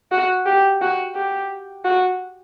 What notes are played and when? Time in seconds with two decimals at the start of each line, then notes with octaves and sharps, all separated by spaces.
0.12 F#4
0.46 G4
0.82 F#4
1.15 G4
1.85 F#4